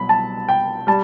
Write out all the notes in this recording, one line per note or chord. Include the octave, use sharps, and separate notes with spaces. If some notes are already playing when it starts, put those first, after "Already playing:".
Already playing: C2 B2 F#3 B5
A5
G5
G3 A5